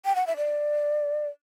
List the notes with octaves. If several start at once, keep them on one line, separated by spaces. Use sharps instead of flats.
G5
F#5
E5
D5